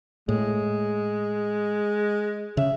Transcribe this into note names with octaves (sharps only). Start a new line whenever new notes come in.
A2 G#3
C#3 E5